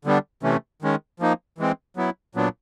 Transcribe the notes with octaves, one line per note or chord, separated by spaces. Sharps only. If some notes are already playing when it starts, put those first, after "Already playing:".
D3 G3 B3 D4
C3 E3 A3 C#4
D#3 G#3 C#4
F3 A#3 D#4
E3 G#3 C4
F#3 B3 E4
A#2 F#3 B3 D4